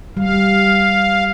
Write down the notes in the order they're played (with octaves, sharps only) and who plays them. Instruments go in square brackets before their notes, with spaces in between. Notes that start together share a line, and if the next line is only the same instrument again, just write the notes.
[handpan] G3 [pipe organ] F5